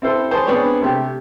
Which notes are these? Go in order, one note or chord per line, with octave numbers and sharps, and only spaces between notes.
C4 E4 A4 C5
G#4 C5 C#5 A5
B3 C4 D4 G#4 C#5
C3 A3 G4